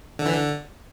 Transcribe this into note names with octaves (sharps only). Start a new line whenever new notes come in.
D3
E3
D3